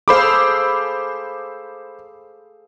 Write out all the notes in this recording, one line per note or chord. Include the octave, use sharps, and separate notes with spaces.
G#4 A4 C5 F5 B5 D6